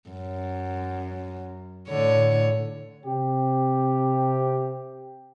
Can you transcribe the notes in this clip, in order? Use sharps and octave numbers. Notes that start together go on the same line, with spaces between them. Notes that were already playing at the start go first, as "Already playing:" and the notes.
F#2
A2 D3 C#5
C3 G4